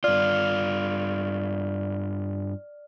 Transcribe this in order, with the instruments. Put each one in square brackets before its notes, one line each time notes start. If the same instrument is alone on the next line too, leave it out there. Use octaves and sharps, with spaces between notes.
[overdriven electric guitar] G2 F4 [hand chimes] D5 F6